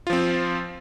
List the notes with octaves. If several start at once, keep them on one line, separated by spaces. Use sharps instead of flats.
F3 C4 F4